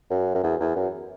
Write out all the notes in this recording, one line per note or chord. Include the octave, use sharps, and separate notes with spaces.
F#2
F#2
E2
E2
F#2